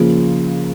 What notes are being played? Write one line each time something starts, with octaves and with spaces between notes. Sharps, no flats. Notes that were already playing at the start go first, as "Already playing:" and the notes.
Already playing: C#3 F3 A#3